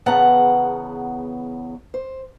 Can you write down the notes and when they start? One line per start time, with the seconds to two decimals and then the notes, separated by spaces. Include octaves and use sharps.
0.06 E2 C#3 B3 F#5 A5 A#5
1.94 C5